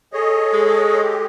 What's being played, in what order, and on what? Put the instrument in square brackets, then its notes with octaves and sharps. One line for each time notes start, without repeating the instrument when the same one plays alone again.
[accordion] G#4 C#5 D#5 [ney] A4
[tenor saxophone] G#3
[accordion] G4